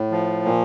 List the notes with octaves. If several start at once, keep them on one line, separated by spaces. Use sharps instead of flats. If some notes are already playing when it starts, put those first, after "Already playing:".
Already playing: A2
F3
A#2